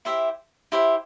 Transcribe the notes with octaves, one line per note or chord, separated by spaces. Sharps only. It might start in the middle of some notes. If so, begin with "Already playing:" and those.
E4 G4 C5 E5
E4 G4 C5 E5